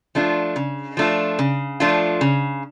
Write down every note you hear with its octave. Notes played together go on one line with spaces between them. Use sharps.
F3 A3 D4 F4
C#3
F3 A3 D4 F4
C#3
F3 A3 D4 F4
C#3